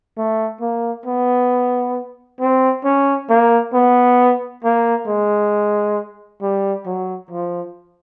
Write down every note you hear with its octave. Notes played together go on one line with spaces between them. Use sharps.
A3
A#3
B3
C4
C#4
A#3
B3
A#3
G#3
G3
F#3
F3